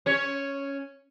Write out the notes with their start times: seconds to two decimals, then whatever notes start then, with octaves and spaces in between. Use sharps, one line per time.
0.06 C#4 C#5